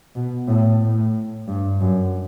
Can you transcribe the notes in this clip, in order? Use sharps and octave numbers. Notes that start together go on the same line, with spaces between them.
B2
A2
A2
G2
F#2